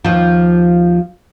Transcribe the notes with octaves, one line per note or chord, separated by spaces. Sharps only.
D#2 F3